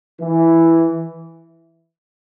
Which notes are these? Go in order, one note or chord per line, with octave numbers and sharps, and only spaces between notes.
E3